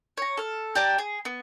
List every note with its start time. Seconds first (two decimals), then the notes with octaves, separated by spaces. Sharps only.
0.18 C#5 A#5
0.37 A4 F6
0.75 G4 D5 A5 A#5
0.98 G#4
1.25 B3